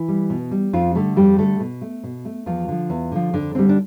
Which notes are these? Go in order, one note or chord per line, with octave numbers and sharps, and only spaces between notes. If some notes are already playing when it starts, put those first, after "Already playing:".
Already playing: E3 E4
G3
B2
G3
F2 F3 F4
D3 G3 A3 A4
F2 G3 G4
D3 G3 A3 A4
B2
A3
B2
A3
E2 F3 F4
D3 F3
E2
D3 F3
F2 D3 D4
D3 G3 C4
D4